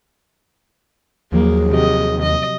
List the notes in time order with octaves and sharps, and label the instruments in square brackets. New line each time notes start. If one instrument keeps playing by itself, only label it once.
[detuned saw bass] D#2 [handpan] F3 F#3 [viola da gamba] A#3 [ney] G#4
[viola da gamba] C3 D#5 [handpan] F#4 G4
[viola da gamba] D#5